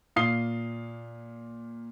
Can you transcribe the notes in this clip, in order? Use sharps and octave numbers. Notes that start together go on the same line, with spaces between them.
A#2 F5 D#6 C7 G7